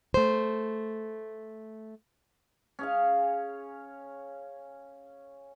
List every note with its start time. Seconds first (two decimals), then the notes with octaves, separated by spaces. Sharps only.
0.14 A3 C5
2.79 C#4 G#4 F5